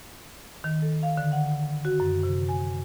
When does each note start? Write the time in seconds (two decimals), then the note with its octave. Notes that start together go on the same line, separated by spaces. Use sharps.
0.64 D#3
0.82 A4
1.03 F5
1.17 D3
1.32 F#5
1.85 F#4
2.00 F#2
2.23 C3
2.49 G#5